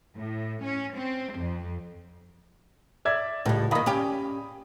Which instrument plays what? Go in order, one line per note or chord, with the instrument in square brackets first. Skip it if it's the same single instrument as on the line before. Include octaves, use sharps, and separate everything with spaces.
[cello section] A2
C#4
C4
F2
[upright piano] D5 E5 G#6
[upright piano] C#2 [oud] A2 G3
[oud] D#3 A#3 [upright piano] F5 B5 D#6
[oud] C#4 G4